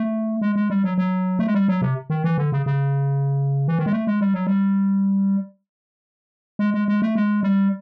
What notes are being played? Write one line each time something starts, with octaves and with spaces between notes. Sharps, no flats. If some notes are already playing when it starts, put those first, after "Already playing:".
Already playing: A3
G#3
G#3
G3
F#3
F#3
A3
G#3
G3
F#3
C3
D#3
E3
D3
C#3
C#3
E3
D#3
G#3
A3
G#3
G3
F#3
G3
G#3
G#3
G#3
A3
G#3
G3